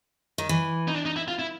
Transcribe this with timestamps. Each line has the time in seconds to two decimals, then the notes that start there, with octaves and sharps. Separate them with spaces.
0.38 D#3
0.49 E3
0.88 D#4
0.95 D4
1.05 D#4
1.16 E4
1.28 F4
1.39 E4